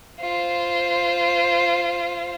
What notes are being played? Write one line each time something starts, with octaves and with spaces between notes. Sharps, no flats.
F4 C5